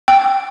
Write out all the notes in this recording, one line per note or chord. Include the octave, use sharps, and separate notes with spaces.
G5